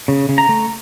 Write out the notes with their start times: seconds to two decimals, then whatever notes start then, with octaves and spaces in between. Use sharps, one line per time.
0.08 C#3
0.29 C#3
0.38 A#5
0.49 A3